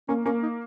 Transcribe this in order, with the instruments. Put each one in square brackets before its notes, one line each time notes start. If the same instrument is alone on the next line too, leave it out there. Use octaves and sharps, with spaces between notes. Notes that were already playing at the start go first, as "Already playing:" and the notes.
[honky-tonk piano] A#3 [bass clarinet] C#4
[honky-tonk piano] A#3 [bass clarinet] C#4
[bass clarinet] D#4